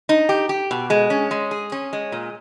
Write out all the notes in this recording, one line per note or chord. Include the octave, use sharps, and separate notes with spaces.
D#4
G4
G4
B2
G#3
C#4
G#3
G#4
C#4
G#3
A#2